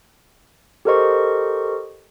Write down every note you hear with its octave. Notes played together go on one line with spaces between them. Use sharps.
G4 A4 A#4 C5 D#5 C#6